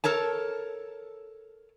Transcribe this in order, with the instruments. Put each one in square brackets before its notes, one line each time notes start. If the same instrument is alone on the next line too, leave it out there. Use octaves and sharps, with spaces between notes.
[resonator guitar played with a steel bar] A4 A#4 C#5 A5